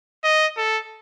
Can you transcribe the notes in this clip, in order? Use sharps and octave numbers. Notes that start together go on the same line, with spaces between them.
D#5
A4